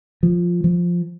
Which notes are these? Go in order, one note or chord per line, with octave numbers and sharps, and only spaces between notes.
F3
F3